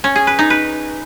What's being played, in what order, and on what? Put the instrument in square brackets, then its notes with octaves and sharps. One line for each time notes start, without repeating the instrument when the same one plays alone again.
[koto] C#4
G#4
B4
D#4
B4